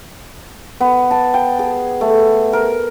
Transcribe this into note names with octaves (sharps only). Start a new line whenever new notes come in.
B3
A5
G5
G#4
A3
A#4